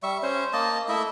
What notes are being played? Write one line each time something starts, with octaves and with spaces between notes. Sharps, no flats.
G3 E5 C#6
C#4 C5
A#3 D#5 A5
A3 E4 D#5 E5